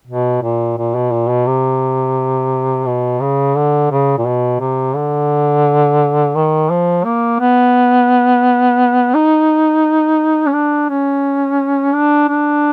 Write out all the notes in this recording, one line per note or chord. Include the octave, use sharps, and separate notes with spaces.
B2
A#2
A#2
B2
A#2
B2
C3
B2
C#3
D3
C#3
A#2
B2
C3
D3
D#3
F3
A#3
B3
D#4
C#4
D4
C#4
D4
D4